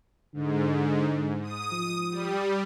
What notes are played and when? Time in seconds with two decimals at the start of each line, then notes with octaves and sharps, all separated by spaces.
0.34 G#2 D3
1.42 D#6
1.72 F3
2.11 G3